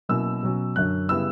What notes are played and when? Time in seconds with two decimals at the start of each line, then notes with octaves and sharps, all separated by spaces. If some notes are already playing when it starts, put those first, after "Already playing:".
0.09 B2 F#3 A#3 C#4 E4 E6
0.43 B2 F#3 C#4
0.76 F#2 D3 F#3 F#6
1.09 C#3 G3 B3 E4 E6